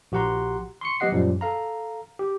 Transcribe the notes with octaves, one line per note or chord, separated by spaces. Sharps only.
A#1 F#4 G4 F#5 A#5 C6
C6 C#6 C#7
F#3 B3 G4 D#5 F#5 C7
F#2 A#2 F3 G3
A4 F5 A#5
G4